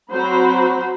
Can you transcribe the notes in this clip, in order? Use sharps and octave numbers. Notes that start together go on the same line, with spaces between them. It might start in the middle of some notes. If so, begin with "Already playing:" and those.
F#3 C4 F#4 C5 A#5 B5